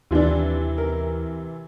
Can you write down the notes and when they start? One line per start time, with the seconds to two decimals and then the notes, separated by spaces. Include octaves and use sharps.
0.11 D#2 C3 E3 D4 F4
0.78 A#4